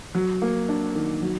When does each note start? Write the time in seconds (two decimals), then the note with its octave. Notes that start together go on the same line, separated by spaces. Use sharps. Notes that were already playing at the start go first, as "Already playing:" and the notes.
0.15 F#3
0.42 A#3
0.69 D4
0.95 D#3
1.22 F#3